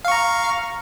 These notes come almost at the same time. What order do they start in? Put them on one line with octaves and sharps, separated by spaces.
F5 C#6 A#5